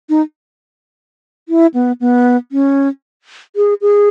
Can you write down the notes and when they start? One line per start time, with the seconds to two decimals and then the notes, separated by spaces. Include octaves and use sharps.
0.09 D#4
1.49 E4
1.74 B3
2.00 B3
2.52 C#4
3.56 G#4
3.81 G#4